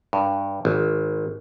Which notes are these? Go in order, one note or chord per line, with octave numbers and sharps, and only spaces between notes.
G2
G#1